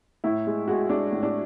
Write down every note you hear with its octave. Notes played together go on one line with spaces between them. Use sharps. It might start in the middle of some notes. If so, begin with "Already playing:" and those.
A2 E4
G#3
G#3 F#4
G#3 D4
A2
D4